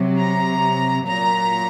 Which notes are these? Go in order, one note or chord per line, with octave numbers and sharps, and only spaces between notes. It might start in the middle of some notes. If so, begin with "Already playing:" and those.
Already playing: C3 F#3
A#5
A#2 F#3 A#5